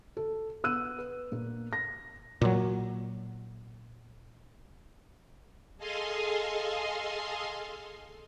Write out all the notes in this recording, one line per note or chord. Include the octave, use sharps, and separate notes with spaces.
A4
B3 E6 F#6 D#7
B4
A#2 A#3
A#6
A#2 F#3
G#4 A4 D#5 F5 G#5 C6